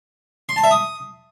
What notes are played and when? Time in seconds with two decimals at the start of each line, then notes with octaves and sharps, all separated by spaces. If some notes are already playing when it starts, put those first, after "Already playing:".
0.49 C6
0.56 A5
0.64 E5
0.71 D#6